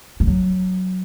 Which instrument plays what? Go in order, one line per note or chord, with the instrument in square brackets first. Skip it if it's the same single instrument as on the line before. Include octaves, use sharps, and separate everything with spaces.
[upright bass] F3
F#3